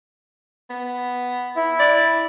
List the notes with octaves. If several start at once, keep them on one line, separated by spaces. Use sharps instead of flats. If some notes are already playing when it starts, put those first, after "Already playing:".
B3
E4
D5